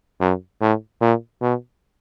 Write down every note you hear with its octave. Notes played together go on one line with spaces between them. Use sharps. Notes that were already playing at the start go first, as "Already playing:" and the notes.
F#2
A2
A#2
B2